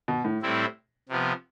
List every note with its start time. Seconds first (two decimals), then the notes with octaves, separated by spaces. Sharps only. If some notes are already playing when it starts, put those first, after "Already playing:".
0.08 B2
0.24 A2
0.42 A2 G3 C4 E4
1.09 C3 F3 B3 F4